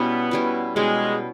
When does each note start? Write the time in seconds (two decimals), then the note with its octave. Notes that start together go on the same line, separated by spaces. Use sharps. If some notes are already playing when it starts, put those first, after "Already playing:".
Already playing: B2 G3 B3 C#4 E4
0.31 B2 G3 C#4 E4
0.75 B2 G3 G#3 C#4 E4